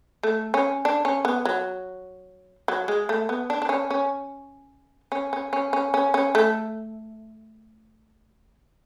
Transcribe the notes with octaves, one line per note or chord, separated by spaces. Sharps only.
A3
C#4
D4
C#4
B3
F#3
F#3
G#3
A3
B3
D4
D4
C#4
C#4
C#4
C#4
C#4
C#4
C#4
C#4
A3